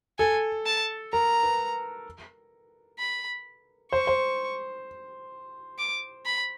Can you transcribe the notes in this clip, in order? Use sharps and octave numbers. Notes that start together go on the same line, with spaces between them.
A4 G#5
A5
A#4 A#5
B4
B5
C5 C#6
C5
D6
B5